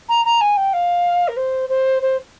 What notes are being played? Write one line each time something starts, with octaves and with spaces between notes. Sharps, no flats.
A#5
A#5
G#5
G5
F5
A#4
C5
C5
C5